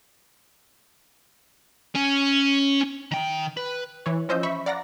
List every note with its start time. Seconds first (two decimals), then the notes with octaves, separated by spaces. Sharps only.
1.95 C#4
3.11 D#3 G5
3.57 B4
4.06 E3 C#5
4.29 F3 C#4 C5 D#5 E6 G6
4.43 E5 B5 C#6 B6
4.66 D5 F5 F#5 A#5 A#6